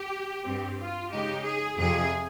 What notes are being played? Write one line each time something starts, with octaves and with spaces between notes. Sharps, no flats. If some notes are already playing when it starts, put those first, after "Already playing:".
Already playing: G4
G2 G3 C4
F4
C#3 G#3 D#4 G4
G#4
F2 C3 F3 G#4